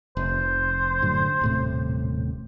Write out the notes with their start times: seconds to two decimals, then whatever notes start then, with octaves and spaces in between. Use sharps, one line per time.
0.17 F1 C5
1.02 F#2 A2 D3
1.41 D#1 A2 C3